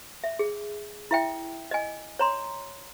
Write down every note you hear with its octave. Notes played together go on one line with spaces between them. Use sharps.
E5
G#4
E4 E5 G5
D#5 G#5
C#5 A#5 C6